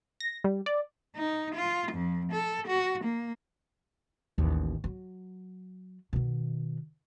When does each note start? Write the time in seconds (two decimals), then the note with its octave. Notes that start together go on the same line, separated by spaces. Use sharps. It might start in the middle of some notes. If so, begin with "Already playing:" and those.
0.20 A#6
0.44 G3
0.66 D5
1.16 D#4
1.54 F4
1.92 F2
2.32 A4
2.67 F#4
3.04 A#3
4.38 A1 D#2
4.84 F#3
6.13 B2 D#3